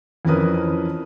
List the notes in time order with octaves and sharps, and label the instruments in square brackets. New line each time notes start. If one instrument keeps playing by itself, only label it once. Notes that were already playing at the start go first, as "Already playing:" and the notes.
[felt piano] F2 E3 C#4 A#4 B4 D#6